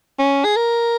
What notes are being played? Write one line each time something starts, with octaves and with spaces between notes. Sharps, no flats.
C#4
G#4
A#4